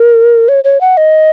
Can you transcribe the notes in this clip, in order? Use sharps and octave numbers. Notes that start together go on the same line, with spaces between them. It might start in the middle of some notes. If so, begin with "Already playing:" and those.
Already playing: A#4
C#5
C#5
F#5
D#5